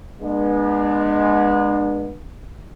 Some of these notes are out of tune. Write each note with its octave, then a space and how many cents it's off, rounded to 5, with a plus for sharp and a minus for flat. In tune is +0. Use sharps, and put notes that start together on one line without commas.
G#3 +0 B3 -30 D4 +35